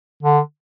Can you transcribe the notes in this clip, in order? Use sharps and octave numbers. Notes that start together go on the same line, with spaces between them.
D3